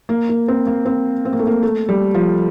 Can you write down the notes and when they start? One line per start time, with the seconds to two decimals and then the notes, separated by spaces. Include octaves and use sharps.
0.09 A#3
0.29 A#3
0.48 C4
0.67 A#3
0.86 C4
1.25 C4
1.33 A#3
1.39 A3
1.47 A#3
1.63 A3
1.89 G3
2.14 F3